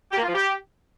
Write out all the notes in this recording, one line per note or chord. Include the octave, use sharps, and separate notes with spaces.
G4
A#3
F4
F3
G4